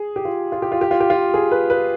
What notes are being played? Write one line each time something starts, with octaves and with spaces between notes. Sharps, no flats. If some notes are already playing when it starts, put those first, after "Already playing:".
Already playing: G#4
G4
F4
F4
G4
F4
G4
F4
G4
F4
G#4
B4
B4